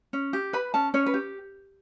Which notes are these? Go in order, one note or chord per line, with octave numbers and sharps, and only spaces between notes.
C#4
G4
B4 B5
C#4 A5
C#4 C#5
B4
G4